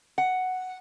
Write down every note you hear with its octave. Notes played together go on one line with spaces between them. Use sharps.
F#5